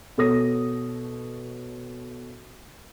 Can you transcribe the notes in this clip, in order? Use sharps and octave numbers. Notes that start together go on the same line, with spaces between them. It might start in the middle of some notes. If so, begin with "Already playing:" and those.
B2 A4 C#5 D#6 A#6